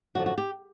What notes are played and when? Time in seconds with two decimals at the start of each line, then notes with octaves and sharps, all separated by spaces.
0.15 F#2 D3 F3 F#4
0.26 F#4
0.38 G4